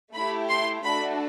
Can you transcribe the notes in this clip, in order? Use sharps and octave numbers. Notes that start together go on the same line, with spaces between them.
A3 E4 G4 B5
C6
A3 D4 F#4 A4 B5